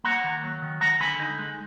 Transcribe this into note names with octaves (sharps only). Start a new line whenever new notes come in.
A#3 F#5 A#5
D#3
F#3
D#3
G#3 F#5 A#5
D3 G#5 B5
D#4
G#3